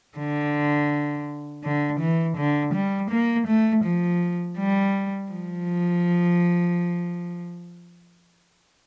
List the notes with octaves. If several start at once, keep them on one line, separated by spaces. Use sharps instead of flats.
D3
D3
E3
D3
G3
A#3
A3
F3
G3
F3